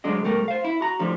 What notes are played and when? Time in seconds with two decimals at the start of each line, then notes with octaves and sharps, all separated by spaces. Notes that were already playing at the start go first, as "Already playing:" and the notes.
0.04 D2 D3 F#3 G#3 D4 D#5
0.24 B2 G3 A3 A#4
0.48 C5 F5
0.64 E4
0.81 F#4 A#5
0.99 A2 D3 F3 G3